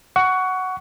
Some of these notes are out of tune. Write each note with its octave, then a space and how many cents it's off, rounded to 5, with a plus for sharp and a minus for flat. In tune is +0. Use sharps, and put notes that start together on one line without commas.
F#5 +5 C#6 +20